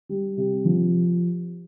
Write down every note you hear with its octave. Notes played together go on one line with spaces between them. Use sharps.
G3
C3
F3